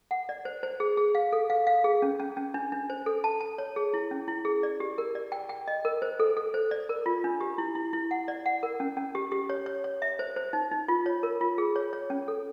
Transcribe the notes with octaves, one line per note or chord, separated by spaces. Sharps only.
F#5
D5
C5
C5
G#4
G#4
F5
A4
F5
F5
G#4
C#4
C#4
C#4
D4
D4
C5
A4
A5
A5
C#5
G#4
E4
C#4
E4
G#4
D5
G4
A#4
D5
G5
G5
D#5
A#4
C5
A4
A4
C5
D5
A#4
F4
D4
G4
E4
E4
E4
F#5
D5
F#5
A#4
C#4
C#4
G4
G4
C#5
C#5
C#5
E5
C5
C5
D#4
D#4
F4
C#5
A#4
F4
G#4
C#5
C#5
C#4
A4